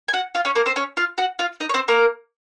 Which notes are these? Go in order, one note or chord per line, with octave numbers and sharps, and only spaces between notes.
G#5
F#4 F#5
F4 F5
C#4 C#5
A#3 A#4
C4 C5
C#4 C#5
F4 F5
F#4 F#5
F4 F5
D#4 D#5
C#5
C4 C5
A#3 A#4